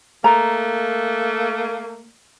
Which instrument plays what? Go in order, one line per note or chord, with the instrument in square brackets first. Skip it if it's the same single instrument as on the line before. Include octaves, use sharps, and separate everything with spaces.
[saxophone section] A3 A#3 [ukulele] A#5